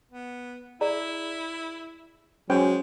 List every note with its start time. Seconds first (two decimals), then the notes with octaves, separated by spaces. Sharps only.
0.11 B3
0.81 E4 G#4 D5 A#5
2.50 F#3 G#3 C#4 C5 G5